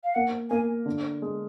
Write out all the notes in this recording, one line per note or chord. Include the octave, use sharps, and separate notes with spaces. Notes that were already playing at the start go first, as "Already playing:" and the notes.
F5
A#3 F#5
A#3 G#5
D3
G#3